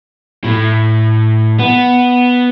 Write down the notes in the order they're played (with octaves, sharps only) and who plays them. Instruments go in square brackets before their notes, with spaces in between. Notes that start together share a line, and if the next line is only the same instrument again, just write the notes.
[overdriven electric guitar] A2
B3